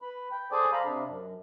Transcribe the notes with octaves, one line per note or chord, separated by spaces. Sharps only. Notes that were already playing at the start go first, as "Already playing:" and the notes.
B4 B5
G5
G#4 A4 C5 D5 G#5 D6
F5 A#5 B5
C3 D4
F#2